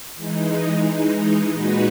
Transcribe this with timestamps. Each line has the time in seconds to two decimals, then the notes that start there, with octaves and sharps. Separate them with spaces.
0.16 E3 G#3 D#4
1.53 A#2 G#3 D#4 F#4 B4